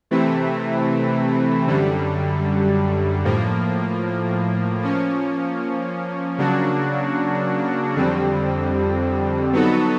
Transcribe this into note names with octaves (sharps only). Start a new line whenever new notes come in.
C3 E3 A3 C4 E4
F#2 D3 G3
A2 F3 A#3
F3 A#3 C#4
C#3 F#3 A#3 D4 F#4
F2 D3 G3 C4
F#3 B3 D#4 F#4 A4